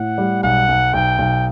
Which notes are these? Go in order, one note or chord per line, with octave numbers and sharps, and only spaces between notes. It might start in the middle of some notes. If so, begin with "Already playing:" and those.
Already playing: A2 F#5
G3
B1 F#5
B1
B1 G5
B1